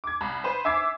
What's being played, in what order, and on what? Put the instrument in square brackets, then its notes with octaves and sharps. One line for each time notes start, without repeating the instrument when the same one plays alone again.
[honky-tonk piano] D6 G#6
C2 A#5 B5
B4 C5
E5 G#5 D6 E6 G#6 C7